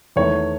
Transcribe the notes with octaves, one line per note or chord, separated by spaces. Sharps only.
E2 D#3 A3 E4 C#5